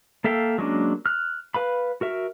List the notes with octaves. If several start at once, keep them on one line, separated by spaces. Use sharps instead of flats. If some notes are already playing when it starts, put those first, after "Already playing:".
A#3 A4 E5 F5 G5
F#3 G#3 A#3 C#4 D4
F6 F#6
B4 F5 B5
F#4 A#4 E5